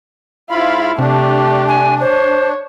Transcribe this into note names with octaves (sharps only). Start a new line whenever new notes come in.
G#2 E4 F4 F5 B5
C3 A3 D4 G4
G#5
C5 C#5